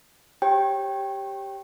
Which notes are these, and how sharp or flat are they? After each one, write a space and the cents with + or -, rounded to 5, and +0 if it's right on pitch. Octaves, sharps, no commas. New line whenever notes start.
G4 +0 C#5 -25 G5 +0